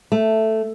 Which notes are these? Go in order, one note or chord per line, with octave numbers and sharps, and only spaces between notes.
A3